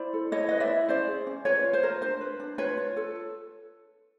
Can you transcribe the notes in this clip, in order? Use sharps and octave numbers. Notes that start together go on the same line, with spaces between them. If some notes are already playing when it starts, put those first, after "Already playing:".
Already playing: E4 C5 D5
A4
E4 C#5 D#5
B4 D#5
D5 E5
E4
C#4 C5 D5
G#4
C#4
F4 B4 C#5
F4
C5
A#4
D4 C5
B4
D4
F4 B4 C#5
F4
A4